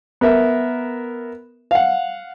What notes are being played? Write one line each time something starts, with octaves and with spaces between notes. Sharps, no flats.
B3 A#4 E5
F5 F#5